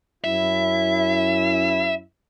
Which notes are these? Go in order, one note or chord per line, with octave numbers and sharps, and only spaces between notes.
F#2 C#4 E4 E5